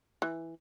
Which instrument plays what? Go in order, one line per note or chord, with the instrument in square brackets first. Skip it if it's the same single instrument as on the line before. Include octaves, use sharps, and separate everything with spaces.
[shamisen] E3